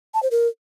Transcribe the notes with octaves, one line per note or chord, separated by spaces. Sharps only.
A5
C5
A#4